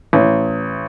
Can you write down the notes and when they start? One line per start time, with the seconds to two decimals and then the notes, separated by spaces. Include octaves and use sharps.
0.13 A1